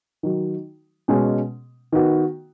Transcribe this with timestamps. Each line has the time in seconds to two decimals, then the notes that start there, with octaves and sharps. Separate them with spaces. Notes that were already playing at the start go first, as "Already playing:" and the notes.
0.23 D#3 F#3 D#4 F#4
1.08 B2 G#3 C#4
1.92 D#3 B3 F#4